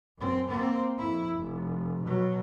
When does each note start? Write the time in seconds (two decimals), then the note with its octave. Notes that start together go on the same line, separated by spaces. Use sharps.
0.18 F#2 C4
0.48 A#3 C4
0.98 F2 E4
1.37 F1
2.04 B2 F#3